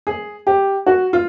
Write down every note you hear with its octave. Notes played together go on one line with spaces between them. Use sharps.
G#4
G4
F#4
F4